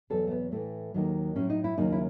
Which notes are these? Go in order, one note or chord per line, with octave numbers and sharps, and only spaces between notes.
E2 B2 F#3 A4
A3
B3
A2 E3 A3
D#2 D#3 F#3
A2 F#3 C#4
D#4
E4
D#2 C#3 F#3 D#4
E4